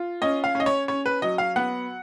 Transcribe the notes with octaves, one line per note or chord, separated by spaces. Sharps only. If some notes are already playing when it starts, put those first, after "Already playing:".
Already playing: F4
C#4 D#5
F5
C#4
D#5
C#5
C#4 C#5
B4
F#3 D#5
F5
B3 F#5